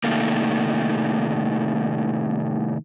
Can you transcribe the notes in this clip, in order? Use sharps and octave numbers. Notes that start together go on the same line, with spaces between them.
A2 C3 D#3 A3 A#3